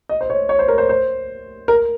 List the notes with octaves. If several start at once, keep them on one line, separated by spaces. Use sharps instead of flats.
D#5
C5
C#5
C#5
C5
A#4
C5
C5
A#4